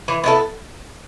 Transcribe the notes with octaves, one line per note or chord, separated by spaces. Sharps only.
E3
B3 E4 A4